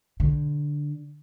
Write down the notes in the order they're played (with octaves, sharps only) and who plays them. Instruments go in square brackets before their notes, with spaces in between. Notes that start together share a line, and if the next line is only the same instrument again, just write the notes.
[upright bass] D3